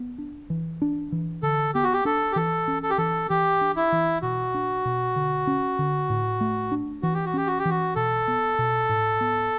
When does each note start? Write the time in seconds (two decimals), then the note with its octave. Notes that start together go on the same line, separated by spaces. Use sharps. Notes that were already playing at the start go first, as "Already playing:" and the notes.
Already playing: B3
0.18 D4
0.50 E3
0.82 D4
1.12 E3
1.43 D3 A4
1.75 B3 G4
1.84 F#4
1.93 G4
2.05 D4 A4
2.32 G4
2.36 E3 A4
2.68 C#4
2.83 A4
2.90 G4
2.98 E3 A4
3.30 E3 G4
3.61 D4
3.76 E4
3.92 E3
4.22 B2 F#4
4.54 D4
4.85 B2
5.16 D3
5.47 C#4
5.79 D3
6.10 A2
6.41 A3
6.72 D4
7.03 E3 F#4
7.14 G4
7.26 F#4
7.34 C#4 G4
7.47 F#4
7.59 G4
7.65 E3 F#4
7.96 B2 A4
8.28 B3
8.58 B2
8.89 A2
9.21 B3